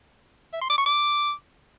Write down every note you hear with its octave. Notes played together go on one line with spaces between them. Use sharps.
E5
C6
D6
C#6
D6